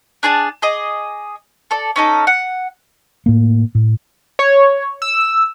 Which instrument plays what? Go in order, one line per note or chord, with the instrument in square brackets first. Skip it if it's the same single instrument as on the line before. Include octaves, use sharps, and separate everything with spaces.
[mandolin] D4 G#4 D5 A5
G#4 D#5 D6
A4 D5
C#4 D#4 A4
F#5
[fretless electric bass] A2 A#3
A2
[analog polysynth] C#5
E6